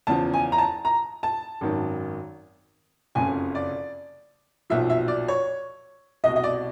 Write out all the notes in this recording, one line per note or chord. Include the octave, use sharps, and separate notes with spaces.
E2 C#3 F3 A5
G#5
A#5
A5
A#5
A5
G#1 F#2 D#3
F#1 F2 C#3 G#5
D5
B1 A#2 F3 E5
E5
D5
C#5
C2 B2 D#5
D#5
D5